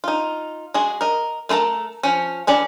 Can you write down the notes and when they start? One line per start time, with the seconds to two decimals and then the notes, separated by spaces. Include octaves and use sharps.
0.04 D#4 F4
0.74 G#3 F#4 G#4
1.01 A#4 D#5
1.49 A3 F4 A4 A#4 A5
2.03 F3 C#4
2.47 E3 C#4 D4 D5